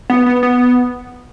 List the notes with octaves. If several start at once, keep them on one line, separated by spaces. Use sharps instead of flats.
B3
B3
B3